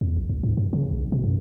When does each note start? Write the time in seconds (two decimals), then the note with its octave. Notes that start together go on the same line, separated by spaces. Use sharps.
0.01 E2
0.17 A#1
0.29 D2
0.43 G#2
0.57 G2
0.73 C#3
0.91 B1
1.12 B2
1.24 F#2